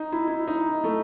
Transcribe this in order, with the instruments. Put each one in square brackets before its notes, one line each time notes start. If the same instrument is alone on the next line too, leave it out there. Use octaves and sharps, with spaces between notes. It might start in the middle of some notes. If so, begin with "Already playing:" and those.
Already playing: [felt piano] D#4
E4
E4
D#4
A3